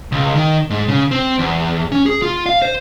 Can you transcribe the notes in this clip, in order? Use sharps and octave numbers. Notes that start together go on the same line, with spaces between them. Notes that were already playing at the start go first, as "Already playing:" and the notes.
C#2
D#3
G#2
C#3
C4
E2
C#4
G#4
F4
F5
C5